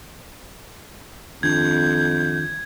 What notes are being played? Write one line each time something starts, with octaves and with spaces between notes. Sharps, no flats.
F2 D#3 D4 F4 G6 G#6